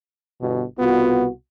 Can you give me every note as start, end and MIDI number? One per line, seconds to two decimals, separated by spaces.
0.41 0.64 31
0.41 0.64 47
0.79 1.29 36
0.79 1.29 47
0.79 1.26 59
0.79 1.26 65
0.79 1.29 66